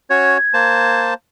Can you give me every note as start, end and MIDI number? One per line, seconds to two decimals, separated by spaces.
0.10 0.38 61
0.10 0.38 66
0.10 0.38 73
0.10 1.01 92
0.54 1.14 58
0.54 1.14 72
0.54 1.14 81